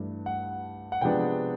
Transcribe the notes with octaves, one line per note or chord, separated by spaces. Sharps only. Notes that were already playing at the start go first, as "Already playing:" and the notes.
Already playing: G2 E3 A3 D4
F#5
F#5
C3 F3 G#3 B3 D4 G5